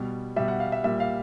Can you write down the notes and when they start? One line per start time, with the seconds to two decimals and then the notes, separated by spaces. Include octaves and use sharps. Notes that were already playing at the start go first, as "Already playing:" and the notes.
Already playing: B2 G3
0.36 B2 G3 E5
0.48 F#5
0.60 F5
0.72 E5
0.84 A#2 G3 E5
1.00 F5